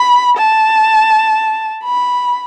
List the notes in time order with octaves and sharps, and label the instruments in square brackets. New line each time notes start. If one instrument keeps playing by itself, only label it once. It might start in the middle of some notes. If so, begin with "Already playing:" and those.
Already playing: [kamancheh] B5
A5
B5